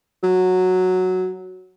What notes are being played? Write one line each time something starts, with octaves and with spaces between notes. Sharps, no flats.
F#3